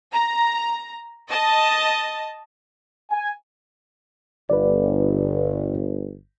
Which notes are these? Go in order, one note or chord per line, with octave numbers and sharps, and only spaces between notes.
A#5
D#5 A5
G#5
G1 B4 D5